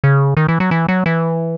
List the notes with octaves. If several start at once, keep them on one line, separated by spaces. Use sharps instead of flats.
C#3
D#3
E3
F#3
E3
F#3
E3